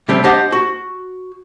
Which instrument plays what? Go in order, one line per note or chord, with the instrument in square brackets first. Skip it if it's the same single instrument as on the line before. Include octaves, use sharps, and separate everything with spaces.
[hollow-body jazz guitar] C3 G3 A3 C4
D4 G4 C5 D#5 F#5 A5
F#4